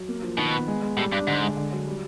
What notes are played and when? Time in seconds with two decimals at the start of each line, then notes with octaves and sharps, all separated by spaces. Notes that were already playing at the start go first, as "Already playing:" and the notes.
Already playing: F#3
0.08 A#3
0.23 F3
0.37 B2 D#3
0.52 B3
0.68 G#3
0.82 G#3
0.97 A2 G3
1.12 G2 D4
1.27 G#2 D3
1.42 G#3
1.57 D3
1.72 F#3
1.87 G3